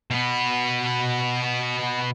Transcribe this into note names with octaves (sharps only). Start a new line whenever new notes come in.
B2 B3